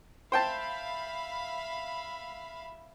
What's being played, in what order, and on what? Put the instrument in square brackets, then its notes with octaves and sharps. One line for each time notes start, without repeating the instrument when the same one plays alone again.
[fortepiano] C5 G5 A5 [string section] E5 F5 B5